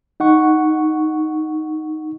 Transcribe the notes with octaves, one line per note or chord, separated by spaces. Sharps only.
D#4 F#5 C#6